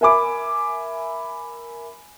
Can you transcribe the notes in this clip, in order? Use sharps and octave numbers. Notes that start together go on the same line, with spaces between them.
A#4 E5 G#5 B5 D6